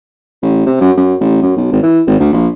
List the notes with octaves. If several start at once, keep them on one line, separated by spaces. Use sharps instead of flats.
A1
C3
F#2
F#2
A1
F#2
B1
G#1
E3
G#1
D2
A#1